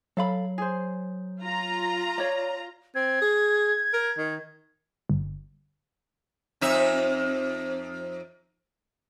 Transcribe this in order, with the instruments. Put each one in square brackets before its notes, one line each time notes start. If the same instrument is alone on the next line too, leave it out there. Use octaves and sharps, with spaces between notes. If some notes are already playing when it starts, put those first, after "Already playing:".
[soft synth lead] F#3 [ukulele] A4 F5 B5
[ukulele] G#4 C5
[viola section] F4 A#5
[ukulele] C#5 D5
[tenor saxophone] C4 [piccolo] G#6
[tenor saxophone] G#4
A#4
D#3
[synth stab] G1
[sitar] F2 D#4 E5